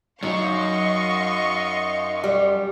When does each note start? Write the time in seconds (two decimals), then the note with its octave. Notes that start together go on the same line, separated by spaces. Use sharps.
0.23 F#2 F#3 D#4 D#5 F5 C6 C#6
2.24 G3